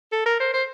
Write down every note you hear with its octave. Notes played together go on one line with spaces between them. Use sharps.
A4
A#4
C5
C5